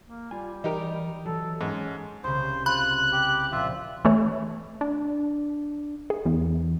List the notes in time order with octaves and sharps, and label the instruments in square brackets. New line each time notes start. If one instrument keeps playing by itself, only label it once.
[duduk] A#3
[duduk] G3 [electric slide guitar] F4 G#5
[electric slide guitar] E3 [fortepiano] D#4 G4 A#4
[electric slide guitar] E3 F#3 [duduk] A4
[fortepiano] G#2 [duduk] C#4
[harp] C2 C#3 [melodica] C5
[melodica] F4 [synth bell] B5 [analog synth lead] F#6
[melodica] G4
[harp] A#2 F3 [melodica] F4 E5
[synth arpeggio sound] E3 A3 C#5
[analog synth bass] D4
[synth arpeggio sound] G#4
[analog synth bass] E2